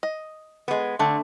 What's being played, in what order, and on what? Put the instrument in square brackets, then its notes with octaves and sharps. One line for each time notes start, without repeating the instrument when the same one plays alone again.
[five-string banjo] D#5
[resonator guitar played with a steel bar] G#3 B3
[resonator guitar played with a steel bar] D3 [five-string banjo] A3 C4